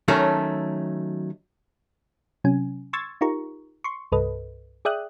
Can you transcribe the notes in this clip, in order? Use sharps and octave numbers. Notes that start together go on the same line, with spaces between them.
D#3 F#3 A3 C#4 A4
C3 F#3 C#4 G#5
C6 C#6 E6 G#6 A6
D#4 F4 G4 A#4 A#5 C#6
C6 C#6
C2 G2 A4 B4 D#5
G#4 D5 E5 G5 D#6 F#6